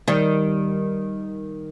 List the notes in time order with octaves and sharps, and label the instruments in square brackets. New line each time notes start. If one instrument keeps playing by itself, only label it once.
[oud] D#3 G3